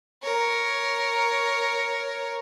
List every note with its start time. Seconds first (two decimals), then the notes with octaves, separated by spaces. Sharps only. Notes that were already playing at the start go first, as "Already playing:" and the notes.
0.23 A#4 C#5